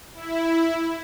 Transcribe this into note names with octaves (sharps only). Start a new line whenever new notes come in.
E4